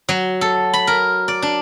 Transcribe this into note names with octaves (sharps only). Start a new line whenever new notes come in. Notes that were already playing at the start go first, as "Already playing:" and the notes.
F#3
A4
B5
A#4
D5
D4